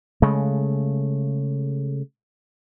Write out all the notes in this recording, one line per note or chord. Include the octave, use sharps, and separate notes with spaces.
C#3 G#3 A3